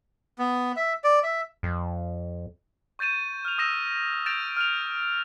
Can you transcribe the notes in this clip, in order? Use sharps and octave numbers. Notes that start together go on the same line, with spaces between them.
B3
E5
D5
E5
F2
C#6 G6 A6 D#7 E7
F6 F7
D#6 E6 A#6 E7
G6 A6 A#6 D7 E7 F7
F6 F7